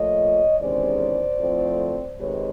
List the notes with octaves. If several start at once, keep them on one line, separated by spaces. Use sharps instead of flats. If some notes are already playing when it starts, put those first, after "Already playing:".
Already playing: A#2 F3 A3 C#5 D#5
E2 C3 D#3 G#3 C#4 C5 D5
A2 F3 A3 C4
C3 D#3 G#3 B4 C#5